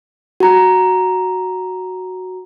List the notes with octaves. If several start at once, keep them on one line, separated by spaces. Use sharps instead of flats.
F#4 A#5